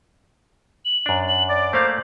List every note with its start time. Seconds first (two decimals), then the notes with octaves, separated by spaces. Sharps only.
0.85 F#7
1.06 F#2 D4
1.28 F#7
1.49 D5 D6
1.73 A3 A#3 C5 F5